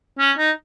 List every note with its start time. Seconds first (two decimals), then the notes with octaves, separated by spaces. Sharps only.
0.19 C#4
0.38 D#4